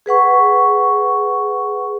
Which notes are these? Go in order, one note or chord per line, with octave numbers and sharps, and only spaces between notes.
G#4 B4 F#5 C#6